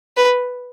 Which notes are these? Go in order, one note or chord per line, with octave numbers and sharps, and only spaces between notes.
B4